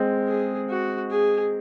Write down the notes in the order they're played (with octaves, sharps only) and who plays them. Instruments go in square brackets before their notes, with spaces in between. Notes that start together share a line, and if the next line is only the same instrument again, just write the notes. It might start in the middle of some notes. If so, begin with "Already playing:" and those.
Already playing: [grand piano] G#3 C4
[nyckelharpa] G#4
F#4
G#4